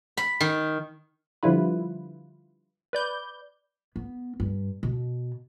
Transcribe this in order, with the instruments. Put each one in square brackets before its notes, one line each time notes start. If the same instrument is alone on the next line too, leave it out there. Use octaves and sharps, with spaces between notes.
[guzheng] B5
D#3
[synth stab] D3 F3 G3 E4 F4 B4
B4 D5 G6
[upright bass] B3
G2
B2